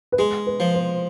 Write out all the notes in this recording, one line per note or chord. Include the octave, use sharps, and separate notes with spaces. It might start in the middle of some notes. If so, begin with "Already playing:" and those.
B4
G#3 G#4
B4
F3
C5